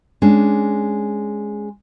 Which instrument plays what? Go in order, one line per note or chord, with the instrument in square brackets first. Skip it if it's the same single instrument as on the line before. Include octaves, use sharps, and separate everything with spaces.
[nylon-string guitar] G#3 C#4 D4